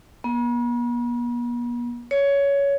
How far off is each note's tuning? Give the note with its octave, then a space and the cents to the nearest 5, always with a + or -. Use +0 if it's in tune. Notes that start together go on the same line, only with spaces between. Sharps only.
B3 -45
C#5 +15